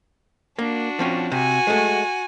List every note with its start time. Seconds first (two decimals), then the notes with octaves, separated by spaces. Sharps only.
0.59 A#3 D4 F#4
0.99 F3 C4 C#4
1.32 C3 F#4 G#5
1.67 G#3 A3